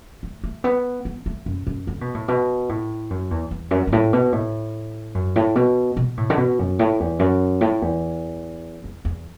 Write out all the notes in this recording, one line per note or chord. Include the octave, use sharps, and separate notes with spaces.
A3
A3
B3
B3
A3
F#2
F#2
D3
B2
A2
B2
A2
F#2
E2
E2
F#2
F#2
A2
B2
A2
F#2
A2
B2
B2
A2
D3
B2
F#2
A2
E2
F#2
A2
E2
E2
E2